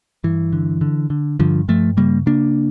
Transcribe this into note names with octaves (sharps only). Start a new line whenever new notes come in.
G2 E3
D3
D3
D3
G2 D3 F3
G2 F3 A3
C#3 G3 A#3
C#3 A#3 D4